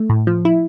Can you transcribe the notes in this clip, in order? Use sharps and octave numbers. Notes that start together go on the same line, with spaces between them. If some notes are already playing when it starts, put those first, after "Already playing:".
Already playing: A3
A2
F3
E4